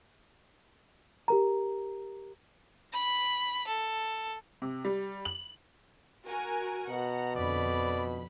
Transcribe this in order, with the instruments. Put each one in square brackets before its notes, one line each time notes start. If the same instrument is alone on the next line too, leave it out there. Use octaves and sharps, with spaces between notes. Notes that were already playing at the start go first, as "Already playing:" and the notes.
[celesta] G4 A#4 A#5
[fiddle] B5
A4
[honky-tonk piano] C3
G3
F#7
[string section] F#4 A#4 G#5
[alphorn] B2 [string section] F#5 [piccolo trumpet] A#5
[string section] F2 D3 B5 [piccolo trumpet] D5